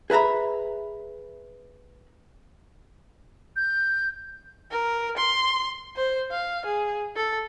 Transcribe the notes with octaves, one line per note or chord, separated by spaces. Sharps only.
G#4 B4 E5 A#5 B5
G6
A#4
C6
C5
F5
G#4
A4